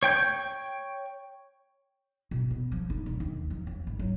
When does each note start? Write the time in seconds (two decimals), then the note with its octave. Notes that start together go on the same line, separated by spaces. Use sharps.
0.03 C#5 G5 G6
2.31 B2
2.51 B3
2.72 F3
2.90 D#4
3.06 E1
3.20 D#2
3.50 F3
3.67 F2
3.87 G#1
3.99 F#3